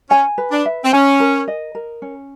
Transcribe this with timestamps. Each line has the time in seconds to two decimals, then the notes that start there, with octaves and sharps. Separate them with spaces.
0.10 C#4 G#5
0.38 B4
0.51 D4
0.65 E5
0.84 C4
0.93 C#4 G#5
1.20 A#4
1.48 D#5
1.75 A#4
2.02 C#4